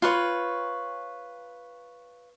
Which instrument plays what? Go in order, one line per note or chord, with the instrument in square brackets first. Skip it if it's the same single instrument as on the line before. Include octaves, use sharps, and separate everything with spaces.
[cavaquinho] F4 B4 C#5